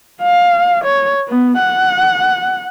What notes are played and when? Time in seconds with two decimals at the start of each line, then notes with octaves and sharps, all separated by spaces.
0.22 F5
0.84 C#5
1.28 B3
1.58 F#5